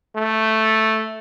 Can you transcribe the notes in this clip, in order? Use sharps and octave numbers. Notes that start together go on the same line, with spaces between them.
A3